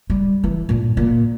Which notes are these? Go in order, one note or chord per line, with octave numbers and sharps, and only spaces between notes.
G3
E3
G2 A#2
A#2